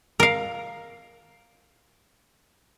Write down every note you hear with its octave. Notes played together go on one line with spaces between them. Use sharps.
A#4 F5